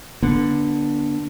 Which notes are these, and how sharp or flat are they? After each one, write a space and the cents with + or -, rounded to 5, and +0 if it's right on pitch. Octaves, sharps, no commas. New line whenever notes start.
D3 +0 B3 -30